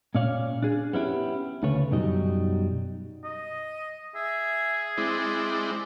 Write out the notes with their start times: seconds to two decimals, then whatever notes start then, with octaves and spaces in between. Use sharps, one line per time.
0.15 A#2 C#4 C#5 D5 F5
0.63 D4 G#4
0.93 B3 C#4 E4 G4
1.63 D2 C#3 A4 B4 C#5
1.91 F#2 B2 F#3 G3 D#4 D#5
3.24 D#5
4.15 G#4 E5
4.98 G#3 C4 E4 D5